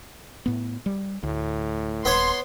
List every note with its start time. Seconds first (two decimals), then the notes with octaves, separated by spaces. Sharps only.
0.46 A2 B3
0.86 G3
1.23 D2 A2
2.05 D#1 B3 C#5 C6